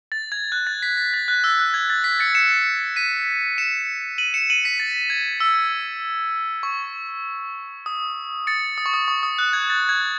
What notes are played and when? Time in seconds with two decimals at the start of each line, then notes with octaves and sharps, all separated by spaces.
0.12 A6
0.32 G#6
0.52 F#6
0.67 A6
0.83 B6
0.97 B6
1.13 A6
1.28 F#6
1.44 E6
1.59 F#6
1.74 G#6
1.90 A6
2.04 B6
2.19 A6 C#7
2.35 C#7 E7
2.96 B6 D#7
3.58 C#7 E7
4.18 D#7 F#7
4.34 C#7 E7
4.50 D#7 F#7
4.64 B6 D#7
4.80 A6
5.10 G#6
5.40 E6
6.63 C#6
7.86 D#6
8.47 A6 C#7
8.78 D#6
8.86 C#6
8.94 D#6
9.08 C#6
9.23 D#6
9.38 F#6
9.53 G#6
9.70 A6
9.89 G#6